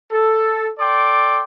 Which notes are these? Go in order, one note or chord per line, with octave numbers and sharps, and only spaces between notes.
A4
A4 D5 G5 C6 D6